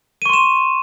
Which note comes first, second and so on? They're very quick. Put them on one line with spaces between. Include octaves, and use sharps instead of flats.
D#7 C#6 C6 E7